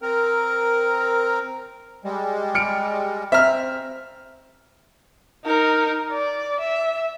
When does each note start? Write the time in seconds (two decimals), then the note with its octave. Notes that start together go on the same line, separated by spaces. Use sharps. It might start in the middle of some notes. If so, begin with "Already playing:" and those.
0.02 C4 A#4
2.05 G3 G#3
2.55 F6 C#7 D7
3.32 C4 E5 A#5 F6
5.45 D#4 A#4
6.11 D5
6.60 E5